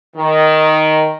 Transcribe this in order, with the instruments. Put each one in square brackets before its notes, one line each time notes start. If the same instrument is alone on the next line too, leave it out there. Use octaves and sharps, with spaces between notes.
[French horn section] D#3